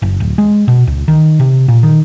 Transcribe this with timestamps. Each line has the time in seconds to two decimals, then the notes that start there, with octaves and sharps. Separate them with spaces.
0.02 F#1
0.20 D1
0.38 G#3
0.68 B2
0.87 C#2
1.08 D#3
1.39 C3
1.68 A#2
1.83 D#3